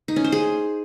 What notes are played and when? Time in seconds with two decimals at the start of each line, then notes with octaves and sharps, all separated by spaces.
0.08 D#4
0.16 C#4
0.24 C5
0.32 G#4